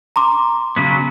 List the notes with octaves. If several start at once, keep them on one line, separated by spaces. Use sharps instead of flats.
A#5 C6 D6
C#3 F#3 B3